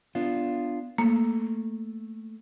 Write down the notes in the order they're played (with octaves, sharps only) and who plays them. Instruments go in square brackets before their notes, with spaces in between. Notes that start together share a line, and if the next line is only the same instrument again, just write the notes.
[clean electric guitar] B3 D4 F4
[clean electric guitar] A3 [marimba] A#3